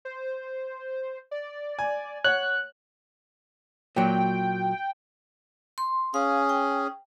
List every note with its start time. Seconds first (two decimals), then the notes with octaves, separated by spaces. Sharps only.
0.05 C5
1.31 D5
1.79 G#5
2.24 C#5 F#5 F#6
3.96 A#2 F#3 G5
5.78 C6
6.14 C#4 G#4 F5
6.49 G5